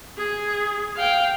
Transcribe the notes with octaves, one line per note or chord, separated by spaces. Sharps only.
G#4
F5 G5